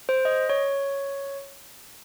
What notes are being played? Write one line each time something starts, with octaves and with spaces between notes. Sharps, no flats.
C5
D#5
C#5